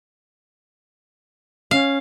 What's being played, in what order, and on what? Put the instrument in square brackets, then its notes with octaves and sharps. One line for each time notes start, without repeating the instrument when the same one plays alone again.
[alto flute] C#4 [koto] F5